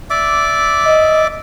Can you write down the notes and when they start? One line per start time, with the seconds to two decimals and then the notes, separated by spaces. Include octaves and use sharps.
0.10 D5 E5 D6
0.86 D#5